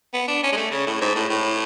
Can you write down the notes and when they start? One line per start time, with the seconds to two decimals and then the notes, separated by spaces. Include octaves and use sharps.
0.13 B3
0.28 D4
0.43 C#4
0.52 G#3
0.57 A3
0.71 C#3
0.87 A2
1.01 G#2
1.15 A2
1.30 A2